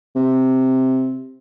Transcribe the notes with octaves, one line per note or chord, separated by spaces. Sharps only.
C3